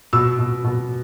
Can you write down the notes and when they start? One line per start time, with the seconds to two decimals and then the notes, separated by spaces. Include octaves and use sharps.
0.13 B2 E6
0.39 B2
0.64 B2